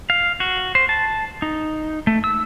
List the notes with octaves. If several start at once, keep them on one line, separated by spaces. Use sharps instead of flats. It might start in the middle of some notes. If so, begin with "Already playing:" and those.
F5
F#4
C5
A5
D#4
A3
E6